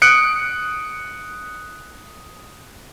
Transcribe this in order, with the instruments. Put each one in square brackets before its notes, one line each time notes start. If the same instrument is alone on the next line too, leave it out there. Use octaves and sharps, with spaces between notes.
[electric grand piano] D#6 F#6 C#7 D7